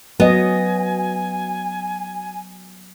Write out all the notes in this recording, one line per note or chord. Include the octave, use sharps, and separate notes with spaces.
F#3 B3 D#5 G#5